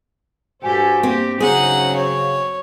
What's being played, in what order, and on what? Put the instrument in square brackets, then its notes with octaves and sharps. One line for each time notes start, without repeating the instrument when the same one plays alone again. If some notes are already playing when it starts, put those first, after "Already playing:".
[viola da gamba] G2 G4 A4 [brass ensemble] F#4 C5 G#5
[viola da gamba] A#3 G4 [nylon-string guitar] C4
[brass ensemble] C#3 [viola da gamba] F#3 C4 [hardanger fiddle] D#4 F#5 [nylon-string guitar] G#4
[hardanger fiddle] C#5